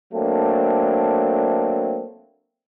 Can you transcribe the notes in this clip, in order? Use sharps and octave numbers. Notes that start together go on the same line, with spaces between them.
F#3 A3 A#3 C4 D4